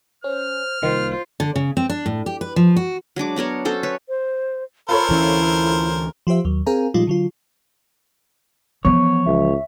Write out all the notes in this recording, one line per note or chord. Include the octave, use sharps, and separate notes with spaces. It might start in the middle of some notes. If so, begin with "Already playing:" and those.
C#4 C5 F6
C2 D#3 A#3 F4 C5
D3
C#3
C4
D4
A2
G4
B4
F3
F#4
F#3 G#3 D4 D6
B3 D4 A#4 C#5
C#4 F#4 A4 C5
B4 C#5
C5
F4 A4 A#4 C5 C#5 B5
D2 E3 C#4 E4
F3 F4 G4 C5 E5
D#2 F#3
C4 G#4 A#4 F5 G#5 A#5
A#2 F3 G3 G#3 D#4 F4
D3 F#3 F4
E3 F3 B3 C#5
C#2 E5